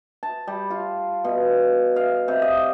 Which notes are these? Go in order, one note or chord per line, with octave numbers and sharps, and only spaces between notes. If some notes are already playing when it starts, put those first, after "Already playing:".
A5
G3
F4
B2
F5
C3
D#5